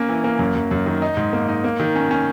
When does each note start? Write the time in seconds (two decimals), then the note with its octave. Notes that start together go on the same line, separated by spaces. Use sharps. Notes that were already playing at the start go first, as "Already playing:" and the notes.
Already playing: A#3 C#4
0.09 E3
0.24 A#3
0.39 F#2
0.55 F#2
0.71 F#2
0.86 D#3
1.02 D#4
1.17 G#2
1.33 A#3
1.48 D#4
1.64 A#3
1.80 D#3
1.95 C#4
2.11 C#4